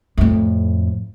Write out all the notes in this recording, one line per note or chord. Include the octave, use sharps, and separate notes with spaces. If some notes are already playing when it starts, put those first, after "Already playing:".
F2 A2